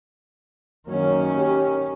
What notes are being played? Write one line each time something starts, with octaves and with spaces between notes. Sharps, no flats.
F#2 D#3 F#3 A#3 C#4
G4